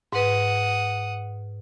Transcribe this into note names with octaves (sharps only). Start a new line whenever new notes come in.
G#2 B4 F#5 D#6